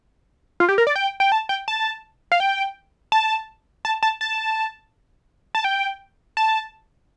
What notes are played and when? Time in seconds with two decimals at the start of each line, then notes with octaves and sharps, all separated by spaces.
0.60 F4
0.69 G4
0.78 A#4
0.87 D5
0.96 G5
1.20 G5
1.32 A5
1.49 G5
1.68 A5
2.32 F5
2.40 G5
3.12 A5
3.85 A5
4.03 A5
4.21 A5
5.55 A5
5.64 G5
6.37 A5